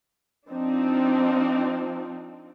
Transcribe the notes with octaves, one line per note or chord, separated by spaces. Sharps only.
F3 C4 D4 D#4